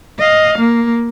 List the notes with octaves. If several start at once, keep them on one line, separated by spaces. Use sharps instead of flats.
D#5 F5
A#3